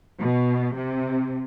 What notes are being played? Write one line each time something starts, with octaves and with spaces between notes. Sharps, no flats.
B2
C3